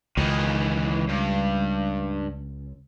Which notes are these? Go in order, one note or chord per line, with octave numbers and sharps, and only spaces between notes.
C#2 D#3 E3
G2